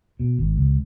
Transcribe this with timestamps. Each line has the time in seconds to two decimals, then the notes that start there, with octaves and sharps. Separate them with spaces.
0.19 B2
0.39 G#1
0.57 C#2